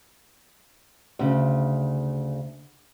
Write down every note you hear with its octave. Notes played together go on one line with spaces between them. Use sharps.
D2 C#3